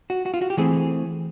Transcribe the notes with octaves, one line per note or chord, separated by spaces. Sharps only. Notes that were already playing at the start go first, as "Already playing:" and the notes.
F#4
F#4
F4
F#4
G4
E3 A3 C4 G#4